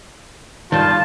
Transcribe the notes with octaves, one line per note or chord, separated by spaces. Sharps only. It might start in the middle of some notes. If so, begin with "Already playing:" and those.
G2 D#3 F4 A5